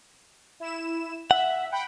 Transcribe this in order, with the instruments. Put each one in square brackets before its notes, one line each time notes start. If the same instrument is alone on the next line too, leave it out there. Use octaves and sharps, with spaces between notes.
[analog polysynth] E4 E7
[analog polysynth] E5 [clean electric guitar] F#5
[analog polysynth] F#5 G5 B5